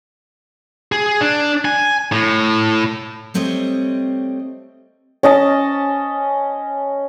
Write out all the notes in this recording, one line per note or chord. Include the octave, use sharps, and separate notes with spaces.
G#4
D4
G#5
A2
G3 A3 C4 C#5 D#5
C#4 D#5 A5